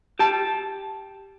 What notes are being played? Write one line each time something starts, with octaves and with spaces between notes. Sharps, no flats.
G4 A5